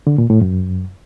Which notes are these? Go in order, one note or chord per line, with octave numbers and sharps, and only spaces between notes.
D3
A#2
A2
F#2